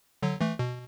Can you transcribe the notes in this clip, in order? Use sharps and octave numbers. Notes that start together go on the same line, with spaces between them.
D3 F#3
E3 A3
B2